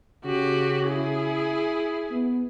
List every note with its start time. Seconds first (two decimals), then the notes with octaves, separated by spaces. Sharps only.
0.25 C#3 F#4 G4
0.88 E4 G#4
2.11 B3